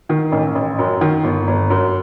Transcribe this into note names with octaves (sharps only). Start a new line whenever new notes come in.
D#3
A1
A1
F#2
D#3
G1
G1
F#2